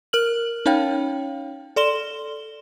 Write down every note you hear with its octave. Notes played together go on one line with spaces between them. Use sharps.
A#4 F6 F#7
C#4 D#4 C#5 F5 G5
A4 D5 C6 E7 G7